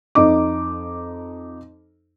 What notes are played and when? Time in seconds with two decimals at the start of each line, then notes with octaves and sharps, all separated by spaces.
0.15 F2 D#4 D6